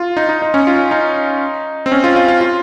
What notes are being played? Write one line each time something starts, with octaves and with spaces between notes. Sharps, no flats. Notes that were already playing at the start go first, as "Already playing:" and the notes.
Already playing: F4
D#4
D#4
D#4
C#4
F4
D#4
C4
C#4
F4
F4
F4
F4